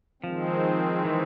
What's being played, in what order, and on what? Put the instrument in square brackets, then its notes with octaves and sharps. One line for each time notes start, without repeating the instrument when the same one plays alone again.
[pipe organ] D#3 G#3 C4 [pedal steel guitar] F3
[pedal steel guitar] E3